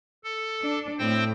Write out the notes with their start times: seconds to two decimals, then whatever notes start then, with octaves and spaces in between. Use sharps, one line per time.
0.24 A4
0.62 D4
0.98 A2 A3 C4 C5 G5